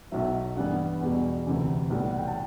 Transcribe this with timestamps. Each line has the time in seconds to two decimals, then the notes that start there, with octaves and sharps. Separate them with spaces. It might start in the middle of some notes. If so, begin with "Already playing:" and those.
0.12 B1 B2 F#3 E5
0.56 G2 E3 G3 B3 F#5
1.01 E2 B2 G3
1.47 D2 C3 E3
1.90 B1 A2 E3 G3
2.11 F#5
2.18 G5
2.27 A5